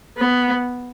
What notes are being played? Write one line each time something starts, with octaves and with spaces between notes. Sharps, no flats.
B3